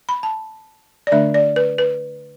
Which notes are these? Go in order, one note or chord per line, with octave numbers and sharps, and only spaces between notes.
B5
A5
D5
D3 A3 D4 E5
D5
B4
B4